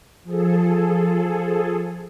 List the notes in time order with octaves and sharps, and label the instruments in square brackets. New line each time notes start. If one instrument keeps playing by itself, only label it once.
[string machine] F3 G#4 A4